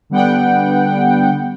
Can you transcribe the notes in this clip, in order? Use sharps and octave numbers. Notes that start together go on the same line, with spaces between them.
D3 G3 B3 F#5 G5